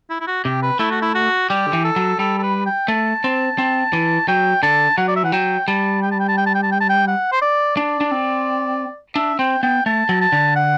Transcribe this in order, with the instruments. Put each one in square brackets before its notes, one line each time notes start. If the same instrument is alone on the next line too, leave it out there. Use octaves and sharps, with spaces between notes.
[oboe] E4
E4
F#4
[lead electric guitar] C3 [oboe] G4
[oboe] B4
[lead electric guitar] A3 [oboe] E4
[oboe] F#4
E4
F#4
[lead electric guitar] G3 [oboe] G4
[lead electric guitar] D3
E3
[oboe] A4
[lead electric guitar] F#3
[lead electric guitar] G3 [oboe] A4
[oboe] A4
B4
G5
[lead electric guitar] A3 [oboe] A5
[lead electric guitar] C4
C4
E3
[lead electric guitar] F#3 [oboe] G5
[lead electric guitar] D3 [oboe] A5
[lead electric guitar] F#3 [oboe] F#5
[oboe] D5
E5
[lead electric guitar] E3 [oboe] F#5
[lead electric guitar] F#3 [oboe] G5
[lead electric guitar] G3 [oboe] A5
[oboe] G5
A5
G5
A5
G5
A5
G5
A5
G5
A5
G5
F#5
C5
D5
[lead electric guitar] D4 [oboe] D5
[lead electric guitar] D4
C4
[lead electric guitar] D4 [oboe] E5
[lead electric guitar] C4 [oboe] G5
[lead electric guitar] B3 [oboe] G5
[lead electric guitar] A3 [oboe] A5
[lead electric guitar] F#3
[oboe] A5
[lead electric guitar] D3
[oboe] F#5